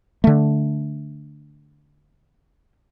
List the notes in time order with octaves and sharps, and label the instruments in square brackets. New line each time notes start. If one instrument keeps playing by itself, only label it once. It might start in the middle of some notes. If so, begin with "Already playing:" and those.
[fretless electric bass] D3 A3